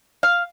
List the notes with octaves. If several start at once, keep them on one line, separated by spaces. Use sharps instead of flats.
F5